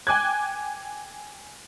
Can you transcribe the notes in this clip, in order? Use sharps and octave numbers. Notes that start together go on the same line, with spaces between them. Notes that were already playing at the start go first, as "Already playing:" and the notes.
G5 G#5 D6 F#6 G#6